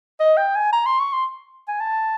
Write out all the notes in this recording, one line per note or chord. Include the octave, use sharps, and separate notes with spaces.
D#5
G5
G#5
A#5
C6
C#6
C6
G#5
A5